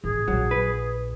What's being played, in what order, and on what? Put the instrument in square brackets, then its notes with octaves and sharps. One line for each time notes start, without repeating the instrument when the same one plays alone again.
[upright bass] A1 [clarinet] G#4
[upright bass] A#1 [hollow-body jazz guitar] F#3
[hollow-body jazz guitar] B4